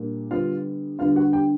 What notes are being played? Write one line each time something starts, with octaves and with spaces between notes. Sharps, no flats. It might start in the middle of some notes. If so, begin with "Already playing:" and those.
Already playing: A#2 G3 A#3 D4
D3 G3 B3 D4 F4 F5
D3 G3 B3 D4 F4 F5
F#4 F#5
G4 G5